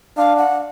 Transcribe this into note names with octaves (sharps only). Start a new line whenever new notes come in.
D4 F5
F#5